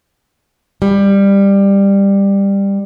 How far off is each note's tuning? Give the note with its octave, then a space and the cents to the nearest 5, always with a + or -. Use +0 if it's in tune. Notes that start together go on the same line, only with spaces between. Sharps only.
G3 +15